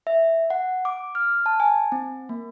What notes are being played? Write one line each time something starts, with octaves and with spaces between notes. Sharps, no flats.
E5
F#5
D6
F6
A5
G#5
C4
A#3